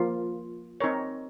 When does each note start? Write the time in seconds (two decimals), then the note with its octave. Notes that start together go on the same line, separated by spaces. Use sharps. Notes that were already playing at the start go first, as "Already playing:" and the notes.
Already playing: F3 A#3 F4
0.80 C4 D#4 A#4 C#5